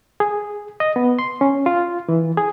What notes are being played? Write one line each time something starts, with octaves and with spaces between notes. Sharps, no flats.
G#4
D#5
B3
C6
C#4
F4
E3
G#4